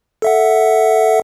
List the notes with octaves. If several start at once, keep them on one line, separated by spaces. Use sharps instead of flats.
A4 E5 F#5